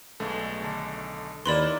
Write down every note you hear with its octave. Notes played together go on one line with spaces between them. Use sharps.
B1 G2 G#3 A3
D3 D#3
D#2 A#3 E4 B4 D5 B5 C6